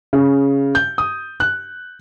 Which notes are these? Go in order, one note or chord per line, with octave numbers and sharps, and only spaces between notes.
C#3
G6
D#6
F#6